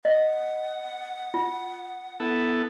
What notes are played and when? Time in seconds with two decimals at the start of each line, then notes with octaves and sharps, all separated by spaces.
0.05 D#5 F#5
1.34 F4
2.20 B3 E4 A4